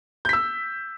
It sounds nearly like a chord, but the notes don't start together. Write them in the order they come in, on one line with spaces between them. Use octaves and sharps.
G6 B6 E6